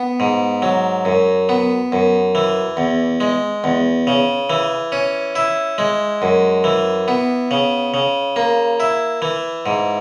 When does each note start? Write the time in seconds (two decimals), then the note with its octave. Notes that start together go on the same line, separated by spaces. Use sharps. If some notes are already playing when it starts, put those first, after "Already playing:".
Already playing: B3
0.20 G#2
0.62 F#3
1.05 F#2
1.49 B3
1.92 F#2
2.35 E3
2.77 E2
3.20 G#3
3.64 E2
4.07 C#3
4.50 E3
4.92 C#4
5.35 E4
5.78 G#3
6.22 F#2
6.64 E3
7.08 B3
7.51 C#3
7.94 C#3
8.36 A#3
8.80 E4
9.22 E3
9.66 G#2